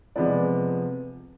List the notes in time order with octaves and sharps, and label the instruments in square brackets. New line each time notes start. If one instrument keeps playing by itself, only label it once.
[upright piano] F2 C3 F3 G#3 B3 D5